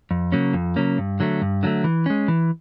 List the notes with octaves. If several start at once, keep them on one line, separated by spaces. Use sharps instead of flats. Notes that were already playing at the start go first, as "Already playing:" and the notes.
F2
C#3 F#3 A#3 C#4
F2
C#3 F#3 A#3 C#4
G2
D3 F#3 A3
G2
D3 F#3 A3
E3
G#3 C#4
E3